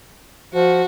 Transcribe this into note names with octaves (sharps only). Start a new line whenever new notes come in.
F3 F#4